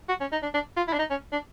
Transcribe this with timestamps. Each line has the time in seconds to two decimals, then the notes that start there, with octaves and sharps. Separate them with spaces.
0.09 F#4
0.20 C#4
0.32 D#4
0.43 D4
0.54 D4
0.77 F4
0.88 E4
0.93 D4
0.99 D#4
1.10 C#4
1.32 D4